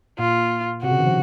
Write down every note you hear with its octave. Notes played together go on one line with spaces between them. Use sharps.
A#2 F4
C3 F#4
C#3
D#3
F3